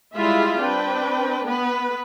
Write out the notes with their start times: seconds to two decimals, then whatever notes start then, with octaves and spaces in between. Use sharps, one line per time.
0.15 G3 G#3 E4 F4 G#4 E5
0.60 C4 D4 B4 G5
1.46 B3 B4